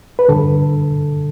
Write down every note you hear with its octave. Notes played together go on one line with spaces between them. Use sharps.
B4
G2 D3 A4